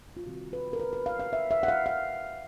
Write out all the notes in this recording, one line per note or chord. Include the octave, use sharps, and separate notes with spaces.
F4
C3 D#3 G3 C4 F#4
B4
A#4
B4
B4
F5
F5
E5
E5
F#5
F5
F5